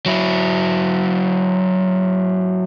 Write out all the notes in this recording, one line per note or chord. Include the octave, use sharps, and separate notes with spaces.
F#3 E4